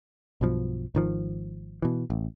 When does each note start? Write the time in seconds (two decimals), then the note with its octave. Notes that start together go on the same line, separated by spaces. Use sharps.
0.41 B1 G2 B2 F3
0.95 G#1 D#3 F3
1.82 B2 E3
2.10 A1